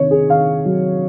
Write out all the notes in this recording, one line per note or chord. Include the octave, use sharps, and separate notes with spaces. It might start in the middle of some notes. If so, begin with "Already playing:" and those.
Already playing: C3 D#3 C#5
G#4
D#3 F5
F#3